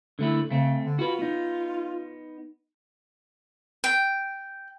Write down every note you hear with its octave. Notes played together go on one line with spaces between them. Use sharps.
D3 A3 E4
C#3 A3 C4
D3
F4 F#4 B4
B3 D#4
G5